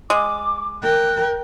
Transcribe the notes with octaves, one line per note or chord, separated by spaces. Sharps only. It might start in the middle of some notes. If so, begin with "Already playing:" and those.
G#3 D6
A#4 G5 F#6